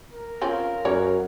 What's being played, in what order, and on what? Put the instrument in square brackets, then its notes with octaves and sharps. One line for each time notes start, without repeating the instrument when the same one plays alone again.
[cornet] A#4
[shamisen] C4 C#4 [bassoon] F4
[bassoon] F#2 [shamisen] C#5